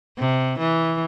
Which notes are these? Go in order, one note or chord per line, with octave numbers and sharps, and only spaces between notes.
C3
E3